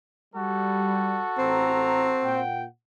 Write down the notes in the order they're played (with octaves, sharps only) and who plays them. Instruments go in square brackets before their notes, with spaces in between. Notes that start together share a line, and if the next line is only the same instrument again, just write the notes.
[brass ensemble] G3 [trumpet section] F#4 A4
[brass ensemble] A1 A#5 [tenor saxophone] C4
[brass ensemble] A#2 F#5 G5